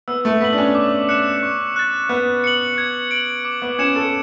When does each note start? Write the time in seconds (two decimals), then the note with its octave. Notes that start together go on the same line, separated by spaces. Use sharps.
0.08 B3 E6
0.25 A3
0.41 B3 B6 F#7
0.53 D4
0.58 C#4
0.75 D6
1.09 F#6 C#7 E7
1.43 C#6
1.76 F#6 A6
2.09 B3 F#6
2.44 C#7 F#7
2.78 G#6
3.11 D7 F#7
3.45 D6
3.62 B3
3.79 C#4 G#6 C#7 E7
3.96 A4